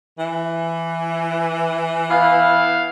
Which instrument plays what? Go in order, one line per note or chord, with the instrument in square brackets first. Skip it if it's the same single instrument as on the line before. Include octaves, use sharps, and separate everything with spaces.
[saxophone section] E3
[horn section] B3 E4 F5